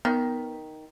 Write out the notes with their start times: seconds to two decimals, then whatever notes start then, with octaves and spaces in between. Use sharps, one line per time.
0.05 D#3 B3